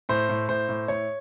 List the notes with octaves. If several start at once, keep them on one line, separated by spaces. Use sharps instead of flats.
A2 C5
A2
A2 C5
A2
A2 C#5